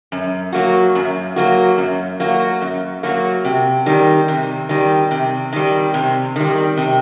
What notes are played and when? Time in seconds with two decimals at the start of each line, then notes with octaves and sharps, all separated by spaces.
0.12 F#2
0.53 F#3 A#3 F#4
0.95 F#2
1.36 F#3 A#3 F#4
1.78 F#2
2.20 F#3 A#3 F#4
2.62 F#2
3.03 F#3 A#3 F#4
3.45 C3
3.86 D#3 G3
4.28 C3
4.69 D#3 G3
5.11 C3
5.53 D#3 G3
5.94 C3
6.36 D#3 G3
6.77 C3